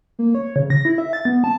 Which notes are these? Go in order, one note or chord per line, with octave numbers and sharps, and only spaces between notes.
A#3
C#5
C#3
A#6
E4
E5
A6
B3
A5